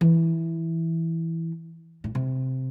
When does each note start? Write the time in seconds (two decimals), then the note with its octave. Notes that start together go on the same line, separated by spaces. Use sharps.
0.01 E3
2.04 A2
2.15 C3